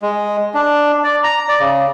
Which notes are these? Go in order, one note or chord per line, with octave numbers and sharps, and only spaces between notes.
G#3
D4
D5
A#5
D5
C#3